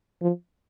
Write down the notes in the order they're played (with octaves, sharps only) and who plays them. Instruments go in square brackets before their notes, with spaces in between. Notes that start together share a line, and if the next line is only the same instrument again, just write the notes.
[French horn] F3